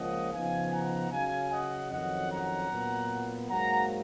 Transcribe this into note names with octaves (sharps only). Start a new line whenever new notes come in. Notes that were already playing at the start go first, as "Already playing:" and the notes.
Already playing: C#2 C#3 F3 A#3 C#4 D#5 F#5
C#3 F3 B3 D#4 F5 G#5
F#5 A#5
C#3 F#3 C#4 F5 G#5
D#5 F#5
F2 D#3 F#3 C#4 D#5 F#5
F#5 A#5
A#2 F#3 B3
G#2 F#3 A#3 F#5 A#5